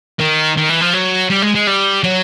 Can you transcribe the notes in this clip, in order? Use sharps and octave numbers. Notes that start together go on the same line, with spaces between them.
D#3
D#3
E3
F3
F#3
G3
G#3
G#3
G3
F#3